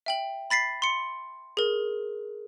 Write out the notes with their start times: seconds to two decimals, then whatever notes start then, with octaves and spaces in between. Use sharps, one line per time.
0.06 E5 G5 F#7
0.50 B5 A6 B6 C7
0.82 C6 C#7
1.57 G#4 A#4